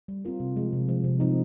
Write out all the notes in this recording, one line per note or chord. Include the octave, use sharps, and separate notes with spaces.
G3
C4 F4 A#4
C3
F3 G#3
C3
F3 G#3
C3
F3 C4 D#4